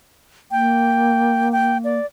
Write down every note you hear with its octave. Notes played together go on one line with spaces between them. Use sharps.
A#3 G5
G5
D5